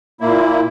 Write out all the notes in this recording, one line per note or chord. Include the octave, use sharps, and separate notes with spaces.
A#2 A#3 E4